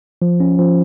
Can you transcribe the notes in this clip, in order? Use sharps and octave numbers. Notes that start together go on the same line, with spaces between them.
F3
C#4
F3